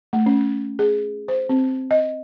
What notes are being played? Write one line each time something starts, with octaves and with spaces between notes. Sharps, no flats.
A3
C#4
G#4
C5
C4
D#5